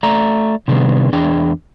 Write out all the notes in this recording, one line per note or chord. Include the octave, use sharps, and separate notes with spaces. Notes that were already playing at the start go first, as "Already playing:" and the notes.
A3 D5 A#5
C3 D#3 G3 B3 D4 G#4
E2 D4 G#4 G5